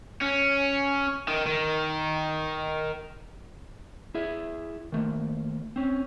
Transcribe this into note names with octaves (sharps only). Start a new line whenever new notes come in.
C#4
D#3
D#3
E4 G#4 E5
D#3 A3 A#3
C4 C#4